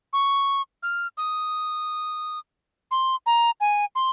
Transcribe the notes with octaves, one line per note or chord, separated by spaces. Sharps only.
C#6
F6
D#6
C6
A#5
G#5
C6